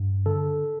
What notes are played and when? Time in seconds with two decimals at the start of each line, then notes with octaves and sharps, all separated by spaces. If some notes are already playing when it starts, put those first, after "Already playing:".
Already playing: G2
0.26 D3 A4